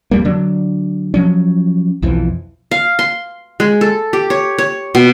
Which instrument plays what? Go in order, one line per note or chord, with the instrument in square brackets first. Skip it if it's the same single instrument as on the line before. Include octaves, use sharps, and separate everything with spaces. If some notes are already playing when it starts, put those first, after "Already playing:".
[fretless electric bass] F2 G3 A#3
D3 F#3 D4
F3 F#3 C#4
B1 F2 E3 F3
[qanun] F5
C6
G#3
A4
G4
C#5
C#5
B2